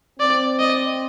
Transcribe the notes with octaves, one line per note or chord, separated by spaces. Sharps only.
C4 D5
D#5